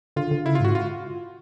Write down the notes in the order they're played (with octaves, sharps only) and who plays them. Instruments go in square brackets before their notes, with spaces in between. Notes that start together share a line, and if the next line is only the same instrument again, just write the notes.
[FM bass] D3 [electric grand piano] F4
[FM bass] D3
[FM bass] C#3 [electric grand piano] E4
[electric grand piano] F4
[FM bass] G#2 [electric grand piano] F#4
[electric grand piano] F4